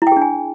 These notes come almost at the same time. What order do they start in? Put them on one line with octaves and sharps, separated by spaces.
E4 G5 G#4 D4 G#5